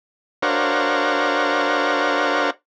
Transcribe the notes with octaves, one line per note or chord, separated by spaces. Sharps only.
D4 F#4 A#4 C5 C#5 F5